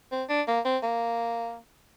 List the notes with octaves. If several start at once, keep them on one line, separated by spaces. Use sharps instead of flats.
C4
D4
A#3
C4
A#3